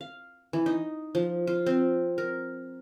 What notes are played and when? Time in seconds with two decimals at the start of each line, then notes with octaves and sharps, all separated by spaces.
0.01 F5
0.53 E3
0.66 D#4
1.15 F3
1.47 F4
1.66 C4
2.18 A#4